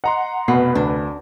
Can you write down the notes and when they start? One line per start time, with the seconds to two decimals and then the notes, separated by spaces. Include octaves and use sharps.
0.04 D#5 F#5 A#5 C6
0.48 F1 B2 B3 B4 C7
0.75 D2 D4